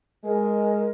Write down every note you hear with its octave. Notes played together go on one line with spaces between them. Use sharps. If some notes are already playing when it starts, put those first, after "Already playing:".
G#3 A#4